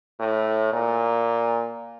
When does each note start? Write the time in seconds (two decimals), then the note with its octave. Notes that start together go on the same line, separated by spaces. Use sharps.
0.19 A2
0.73 A#2